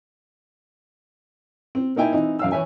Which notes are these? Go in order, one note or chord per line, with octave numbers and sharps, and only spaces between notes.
C4
A#3 D#4 E4 G5 G#5
E3 C4 D#4
F#2 F5 E6
E3 C#5 E5 G#5